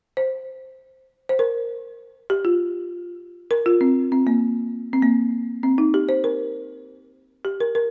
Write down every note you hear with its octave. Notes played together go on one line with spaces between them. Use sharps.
C5
C5
A#4
G4
F4
A#4
F4
C4
C4
A#3
C4
A#3
C4
D#4
G4
C5
A#4
G4
A#4
A#4